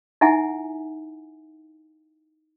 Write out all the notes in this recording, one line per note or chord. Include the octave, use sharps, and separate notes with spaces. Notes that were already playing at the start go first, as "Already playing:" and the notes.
D#4 E4 E5 F#5 G#5